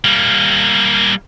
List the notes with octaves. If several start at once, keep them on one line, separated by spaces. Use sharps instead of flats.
G3 A#3